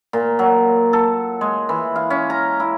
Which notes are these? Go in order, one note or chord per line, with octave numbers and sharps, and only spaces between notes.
A#2
F#3
A4
G#3
E3
F5
C#4
A#5
E4